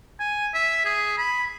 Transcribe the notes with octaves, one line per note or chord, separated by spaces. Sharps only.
G#5
E5
G#4
B5